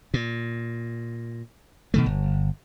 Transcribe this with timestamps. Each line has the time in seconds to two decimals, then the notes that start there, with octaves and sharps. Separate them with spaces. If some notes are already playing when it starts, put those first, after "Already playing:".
0.14 A#2
1.94 B2 D#3 A3
2.06 G1